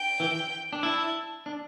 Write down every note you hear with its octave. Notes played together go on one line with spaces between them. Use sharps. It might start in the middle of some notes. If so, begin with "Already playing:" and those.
Already playing: G5
E3
D4
E4 A5
D4